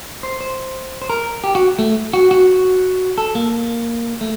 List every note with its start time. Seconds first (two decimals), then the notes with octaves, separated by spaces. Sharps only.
0.23 C5
0.41 C5
1.02 C5
1.10 A#4
1.44 G4
1.55 F#4
1.79 A3
2.14 F#4
2.31 F#4
3.18 A4
3.35 A#3
4.21 A3